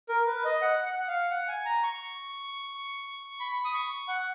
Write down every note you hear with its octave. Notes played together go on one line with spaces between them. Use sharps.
A#4
B4
D#5
F#5
F#5
F#5
F5
F#5
G#5
A#5
C#6
B5
D#6
C#6
F#5